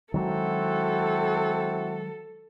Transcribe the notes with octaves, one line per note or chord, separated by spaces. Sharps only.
D#3 F#3 G#3 C4 E4 F#4 A4